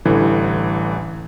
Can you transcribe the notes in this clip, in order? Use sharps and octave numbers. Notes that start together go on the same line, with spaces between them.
A1 D3 E3 G3